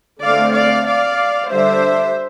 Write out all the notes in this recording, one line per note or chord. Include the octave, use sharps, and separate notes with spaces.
D3 A3 C4 D5 F5
D5 F5
D5 F5
D3 G3 D4 C5 E5